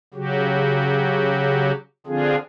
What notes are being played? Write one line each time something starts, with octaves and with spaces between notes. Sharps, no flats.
C#3 F#3 F#4 G4
D3 F3 C4 D4 F4 G#4